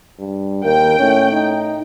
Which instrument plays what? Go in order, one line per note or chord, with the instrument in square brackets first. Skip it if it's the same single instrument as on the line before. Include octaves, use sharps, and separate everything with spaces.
[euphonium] G2
[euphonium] D#2 [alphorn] A#4 [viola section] G5
[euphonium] A2 [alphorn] C#4
[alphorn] D#4